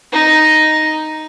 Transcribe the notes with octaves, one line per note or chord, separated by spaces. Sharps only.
D#4